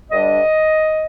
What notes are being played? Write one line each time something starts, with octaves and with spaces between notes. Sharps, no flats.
G2 D3 G3 D4 D#5